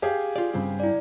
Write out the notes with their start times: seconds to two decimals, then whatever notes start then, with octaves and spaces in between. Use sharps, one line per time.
0.02 G4 G#4 F5
0.36 F4 D5
0.54 G2 C#3 C4
0.80 E4 D5